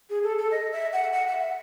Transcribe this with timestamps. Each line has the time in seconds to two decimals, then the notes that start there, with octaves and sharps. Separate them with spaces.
0.10 G#4
0.23 A4
0.38 A4
0.51 D#5
0.72 E5
0.93 F#5
1.13 F#5
1.28 F#5
1.34 E5